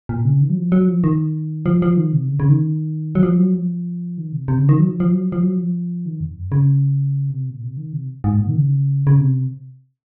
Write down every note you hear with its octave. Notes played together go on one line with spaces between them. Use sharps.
A#2
C#3
D#3
F#3
F3
F#3
F3
D#3
F3
F3
D#3
C3
C#3
C#3
D#3
F#3
F3
F#3
F3
D#3
C3
C3
C#3
D#3
F#3
F3
F3
F#3
F3
F#3
F3
D#3
F2
F#2
C#3
C3
A#2
C3
D#3
C3
G#2
A#2
D#3
C#3
C#3
C3